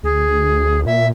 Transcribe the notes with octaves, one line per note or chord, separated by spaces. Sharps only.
D2 G#4
A#2 E5